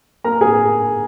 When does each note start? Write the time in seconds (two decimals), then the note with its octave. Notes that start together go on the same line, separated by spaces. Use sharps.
0.24 A#3 A#4 A#5
0.41 G#4 G#5